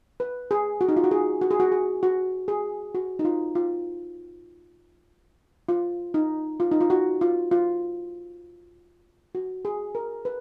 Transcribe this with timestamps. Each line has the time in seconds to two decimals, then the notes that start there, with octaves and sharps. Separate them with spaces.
0.20 B4
0.51 G#4
0.81 F#4
0.89 D#4
0.96 F4
1.04 F#4
1.11 G#4
1.41 F#4
1.51 G#4
1.60 F#4
1.72 G#4
2.03 F#4
2.48 G#4
2.95 F#4
3.19 D#4
3.25 F4
3.55 F4
5.69 F4
6.14 D#4
6.60 F4
6.72 D#4
6.81 F4
6.90 F#4
7.21 F4
7.51 F4
9.35 F#4
9.65 G#4
9.95 A#4
10.25 B4